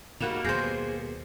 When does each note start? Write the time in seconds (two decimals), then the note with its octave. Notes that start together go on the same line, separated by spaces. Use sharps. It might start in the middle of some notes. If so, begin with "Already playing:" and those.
0.20 G#2 G3 A#3 F#4 F#6 E7 F7
0.44 D#2 B2 G#4 C5 G6 A#6 C7